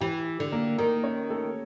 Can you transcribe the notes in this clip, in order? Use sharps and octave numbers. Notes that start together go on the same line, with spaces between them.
E3 G4
D3
A#3 A#4
D#3 A#3 A#4
C#4 C#5
A3 A4